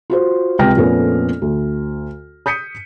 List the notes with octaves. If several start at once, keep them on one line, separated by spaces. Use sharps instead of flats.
F4 F#4 C5
C#2 C3 G4 G5 F6 A#6
F2 A#2 A3 B3 C#4
D2
D#6 G6 B6 C#7 D#7